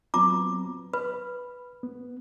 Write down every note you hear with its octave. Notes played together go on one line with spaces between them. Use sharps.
F#3 B3 C4 F4 A#5 D6
B4 B5
B3